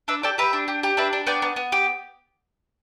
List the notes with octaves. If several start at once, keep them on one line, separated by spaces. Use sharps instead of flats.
D4 B4 E5
G4 A4 D5
G4 B4 E5
D4
G4
G4
D4 B4 E5
D4
B3 D5 G5
B3
B3
G4